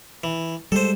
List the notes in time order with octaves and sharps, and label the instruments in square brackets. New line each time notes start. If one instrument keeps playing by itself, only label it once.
[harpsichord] E3
[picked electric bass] G3 G#3 [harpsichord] A4 C5